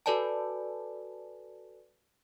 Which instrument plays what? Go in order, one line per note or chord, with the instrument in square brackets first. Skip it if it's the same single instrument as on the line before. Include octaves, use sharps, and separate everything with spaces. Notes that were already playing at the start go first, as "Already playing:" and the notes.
[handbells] F#4 A4 B4 D5 G#5 A5